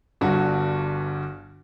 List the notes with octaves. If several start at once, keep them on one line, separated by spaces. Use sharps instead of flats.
G1 G2 F#4